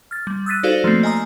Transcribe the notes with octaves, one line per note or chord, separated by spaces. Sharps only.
F6 A6
G3
D#6 E6 F#6 A6 B6 D#7
D#4 F#4 A4 C5 D5 F5
F3 A3 A#3 C4
D#5 G#5 A#5 D#6